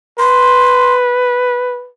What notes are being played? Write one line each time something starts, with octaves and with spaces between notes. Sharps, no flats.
B4 C6